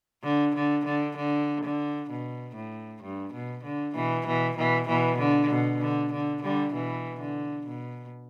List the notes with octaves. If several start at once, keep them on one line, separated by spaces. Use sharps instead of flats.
D3
D3
D3
D3
D3
B2
A2
G2
B2
D3
B2 E3
B2 E3
B2 E3
B2 E3
D3
B2
D3
D3
D3 G3
B2 E3
D3
B2